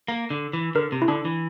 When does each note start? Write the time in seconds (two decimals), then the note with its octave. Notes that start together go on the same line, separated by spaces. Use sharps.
0.08 A#3
0.30 D3
0.53 E3
0.75 D3 A#4
0.92 C3
1.02 E4
1.08 D3 D4
1.25 E3